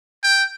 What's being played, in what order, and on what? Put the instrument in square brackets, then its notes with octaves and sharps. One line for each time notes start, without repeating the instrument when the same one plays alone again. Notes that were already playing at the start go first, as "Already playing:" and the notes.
[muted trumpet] G5